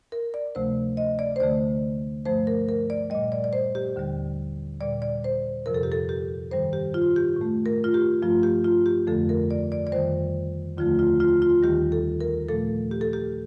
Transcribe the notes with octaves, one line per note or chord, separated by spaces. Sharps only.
A#4
D5
D2 C3 F3 A3 C5
D#5
D5
C5
D2 D3 A3 D5
G2 F3 A3 C5
A#4
A#4
D5
A#2 G3 D#5
D5
D5
C5
G4
D#2 D3 G3
A#2 G3 D5
D5
C5
F2 C3 F3 A#4
A4
G4
A4
G4
G2 D#3 G3 C5
G4
F4
G4
A2
A3
A#4
F4
G4
G2 F3 A3 F4
G4
F4
G4
F2 D3 F3 A3 A4
A#4
D5
D5
D5
F2 D#3 G3 C5
D#2 D3 F3 A3 F4
F4
F4
F4
D#2 D#3 G3 G4
A4
A#4
A#2 F3 A3 A4
G4
A4
G4